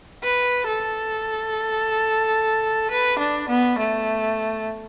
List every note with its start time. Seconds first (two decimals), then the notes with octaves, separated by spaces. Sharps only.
0.23 B4
0.68 A4
2.91 B4
3.19 D4
3.49 B3
3.79 A3